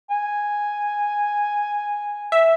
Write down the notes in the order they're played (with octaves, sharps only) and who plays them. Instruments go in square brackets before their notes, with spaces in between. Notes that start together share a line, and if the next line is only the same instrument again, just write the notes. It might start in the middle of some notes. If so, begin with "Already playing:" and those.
[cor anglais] G#5
[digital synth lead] E5